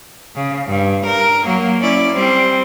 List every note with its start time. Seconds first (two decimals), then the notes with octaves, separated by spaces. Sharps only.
0.35 C#3
0.67 G2
1.06 A#4
1.45 F#3 A#3
1.80 C#4 E4 D5
2.12 G3 C4